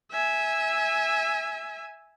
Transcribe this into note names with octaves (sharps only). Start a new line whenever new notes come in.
E5 G#5